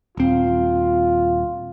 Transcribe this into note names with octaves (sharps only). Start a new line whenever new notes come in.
D#1 C4 F4